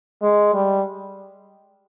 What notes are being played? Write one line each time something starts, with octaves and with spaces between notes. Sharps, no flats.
G#3
G3